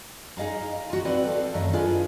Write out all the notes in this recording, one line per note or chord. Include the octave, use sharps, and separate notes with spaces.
D#4 G#4 D#5 F5 A#5
F4 F#4
C4 B4 D5 F#5
A4 F5
F#2 D#3 A3 D#5 E5
D4 F4 G#4 B4